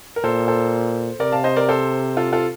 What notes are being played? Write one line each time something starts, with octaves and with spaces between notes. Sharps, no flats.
A#4
A#2 A4 C5
A4 C5
C3 A#4 D5
F5 A5
C5 D#5
A#4 D5
A4 C5
F4 A4
F4 A4